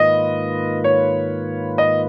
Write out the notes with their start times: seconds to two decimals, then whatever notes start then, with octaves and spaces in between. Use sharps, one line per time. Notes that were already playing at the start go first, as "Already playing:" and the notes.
Already playing: G#2 D#3 A#3 F4 B4 D#5
0.84 C#5
1.78 D#5